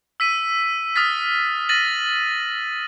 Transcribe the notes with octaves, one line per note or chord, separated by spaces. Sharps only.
E6 B6 D#7
D#6 F6 A6 B6
A6 A#6 D#7 F#7